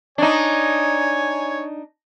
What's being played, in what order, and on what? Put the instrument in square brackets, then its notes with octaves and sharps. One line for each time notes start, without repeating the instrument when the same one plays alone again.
[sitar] D4 D#4 [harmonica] C#5 G#5